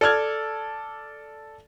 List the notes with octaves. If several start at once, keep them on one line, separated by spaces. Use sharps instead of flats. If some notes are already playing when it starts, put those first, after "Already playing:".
A4 D5 F6 G#6